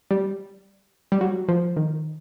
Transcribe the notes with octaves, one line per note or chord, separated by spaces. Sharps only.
G3
G3
F#3
F3
D#3